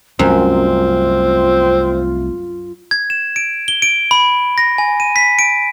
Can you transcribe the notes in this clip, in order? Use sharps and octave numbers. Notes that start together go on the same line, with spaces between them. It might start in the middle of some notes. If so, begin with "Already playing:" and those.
C2 F#2 A3 C4 F4
G#6
E7
D7
G7
D7
B5
A#6
G#5
D#7
B6
D7